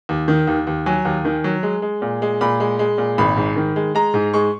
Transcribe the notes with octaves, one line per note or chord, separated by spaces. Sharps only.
D#2
D#3
D#2
D#2
F#3 G#5
D#2
D#3
F#3
G#3
G#3
A#2
G#3
A#2 B5
G#3
G#3
A#2
G#1 B5
G#2
D#3
G#3
G#3 A#5
G#2
G#3 C#6